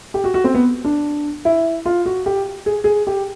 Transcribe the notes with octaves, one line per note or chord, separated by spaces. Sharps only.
G4
F#4
F#4
C4
B3
D4
E4
F4
F#4
G4
G#4
G#4
G4